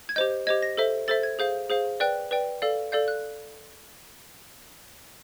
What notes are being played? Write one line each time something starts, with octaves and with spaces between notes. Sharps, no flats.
G#6
G4 C5 D#5 G6
G4 C5 D#5 G#6
A#6
A4 C5 E5
A4 C5 E5 A6
G#6
G#4 C5 F5 G6
G#4 C5 F5
B4 D5 G5 F#6
B4 D5 G5
A4 D5 F5
A4 D5 F5 G6
F#6